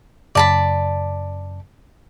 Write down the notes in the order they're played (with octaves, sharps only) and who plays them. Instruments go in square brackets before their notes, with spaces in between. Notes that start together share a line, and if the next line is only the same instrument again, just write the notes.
[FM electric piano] F#2 C#3 [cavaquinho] D5 A5 B5